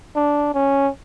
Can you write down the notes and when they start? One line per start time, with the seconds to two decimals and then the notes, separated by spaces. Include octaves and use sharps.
0.15 D4
0.54 C#4